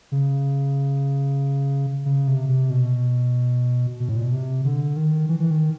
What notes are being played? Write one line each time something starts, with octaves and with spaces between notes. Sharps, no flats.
C#3
C#3
C3
C3
B2
B2
A2
A#2
B2
C3
D3
D#3
E3
E3
D#3